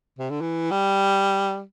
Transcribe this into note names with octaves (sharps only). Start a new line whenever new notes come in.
C3
D3
E3
G3